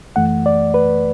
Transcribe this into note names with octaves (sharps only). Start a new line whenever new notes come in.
F#2 E3 A3 F#5
D5
B4